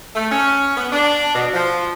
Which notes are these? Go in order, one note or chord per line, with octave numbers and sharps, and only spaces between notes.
A3
C#4
B3
D4
B2
F3